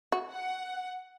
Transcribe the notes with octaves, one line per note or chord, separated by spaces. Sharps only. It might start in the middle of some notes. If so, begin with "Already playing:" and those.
F#4
F#5